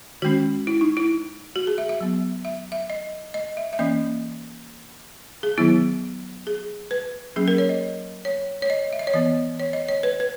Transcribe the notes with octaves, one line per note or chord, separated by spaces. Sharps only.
D#3 G#3 C#4 F#4
E4
D#4
E4
F#4
G#4
E5
E5
F#3 B3
E5
E5
D#5
D#5
E5
E5
E3 A#3 C#4 D#5
G#4
D#3 F#3 B3 E4
G#4
B4
F#3 A#3 C#4 G#4
A#4
C#5
D#5
C#5
C#5
D#5
E5
D#5
C#5
E3 B3 D#5
C#5
D#5
C#5
B4
B4